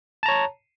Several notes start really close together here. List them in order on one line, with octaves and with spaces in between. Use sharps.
A5 A#5 C#5